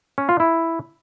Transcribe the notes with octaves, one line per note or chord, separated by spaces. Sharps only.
C#4
F4
E4